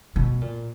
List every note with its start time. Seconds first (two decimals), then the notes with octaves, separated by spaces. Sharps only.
0.16 B2
0.41 A#2